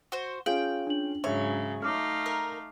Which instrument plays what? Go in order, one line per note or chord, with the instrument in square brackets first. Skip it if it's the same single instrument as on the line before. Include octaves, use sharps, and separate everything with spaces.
[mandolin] F#4 C5
[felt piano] C#4 F4 G#4 [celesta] F5 F#7 [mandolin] G5
[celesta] D4 F#7
[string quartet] G#2 C#3 F#3 [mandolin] C#5 [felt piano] E5
[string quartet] A3 D#4 F5 [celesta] D6 F6
[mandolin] A#4